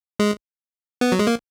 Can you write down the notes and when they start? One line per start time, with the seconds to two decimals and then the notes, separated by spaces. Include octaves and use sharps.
0.20 G#3
1.01 B3
1.12 F#3
1.19 G#3
1.27 A#3